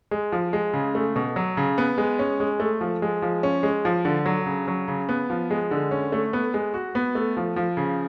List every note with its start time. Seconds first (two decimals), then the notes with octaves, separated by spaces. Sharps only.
0.11 G#3
0.32 F3
0.53 G#3
0.73 C#3
0.95 A3
1.16 B2
1.36 F#3
1.57 C#3
1.78 B3
1.98 G#3
2.19 C#4
2.40 G#3
2.60 A3
2.81 F3
3.02 G#3
3.22 F3
3.43 C#4
3.63 G#3
3.85 F3
4.05 D3
4.26 F#3
4.46 C#3
4.68 F#3
4.88 C#3
5.09 B3
5.30 F3
5.51 G#3
5.71 D3
5.91 C#4
6.12 A3
6.33 B3
6.54 G#3
6.74 F#4
6.95 B3
7.15 A3
7.37 F3
7.56 F3
7.77 C#3